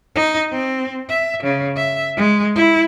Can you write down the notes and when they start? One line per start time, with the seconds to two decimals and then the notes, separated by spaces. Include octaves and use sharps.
0.15 D#4
0.52 C4
1.09 E5
1.43 C#3
1.77 E5
2.17 G#3
2.56 E4